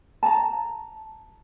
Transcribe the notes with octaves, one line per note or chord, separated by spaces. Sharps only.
A5 A#5